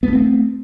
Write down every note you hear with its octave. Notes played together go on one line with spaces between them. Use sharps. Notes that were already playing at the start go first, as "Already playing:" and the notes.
A3 B3 C4